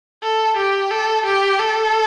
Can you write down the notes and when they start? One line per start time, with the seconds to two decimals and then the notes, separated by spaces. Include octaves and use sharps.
0.23 A4
0.57 G4
0.91 A4
1.26 G4
1.59 A4